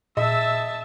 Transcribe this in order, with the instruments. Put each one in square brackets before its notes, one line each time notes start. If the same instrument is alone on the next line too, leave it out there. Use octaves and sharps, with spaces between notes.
[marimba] A#2 [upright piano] D#5 [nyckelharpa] E5 [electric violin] A5 E6